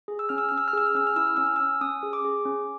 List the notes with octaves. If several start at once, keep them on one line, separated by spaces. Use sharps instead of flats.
G#4
E6
C#4 F6
E6
C#4 F6
E6
F6
G#4 E6
F6
C#4 E6
F6
E4 E6
F6
C#4 E6
F6
C#4 E6
C#4 D#6
G#4
D6
G#4
C#4